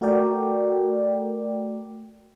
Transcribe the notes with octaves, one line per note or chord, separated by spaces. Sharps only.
A3 F#4 A4 A#4 D5 G5